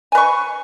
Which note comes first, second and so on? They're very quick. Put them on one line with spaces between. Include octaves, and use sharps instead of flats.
G#5 B4 C#6